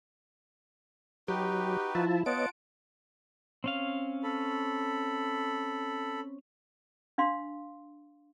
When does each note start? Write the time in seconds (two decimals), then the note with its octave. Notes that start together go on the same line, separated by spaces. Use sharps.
1.28 F#3 D#4 F#4 G4 B4
1.95 F3 E4 F4 A5
2.26 B3 F4 C#5 D#5 F#5 A5 D7
3.64 C4 C#4 F5
4.23 A4 B5
7.18 D4 F5 C6